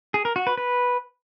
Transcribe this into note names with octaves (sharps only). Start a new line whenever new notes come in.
G#4
A#4
F#4
B4
B4